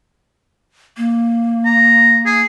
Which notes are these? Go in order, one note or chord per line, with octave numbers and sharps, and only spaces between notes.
A#3
A#5
G#4